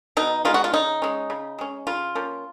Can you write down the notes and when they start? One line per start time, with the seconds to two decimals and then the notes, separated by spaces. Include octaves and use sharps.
0.17 B2 D#4
0.45 G#3 B3 D#4 F4
0.54 F#4
0.64 F4
0.73 C#3 D#4
1.02 G#3 C#4
1.30 C#3
1.58 G#3 C#4
1.87 C#3 F4
2.15 F3 A#3 C#4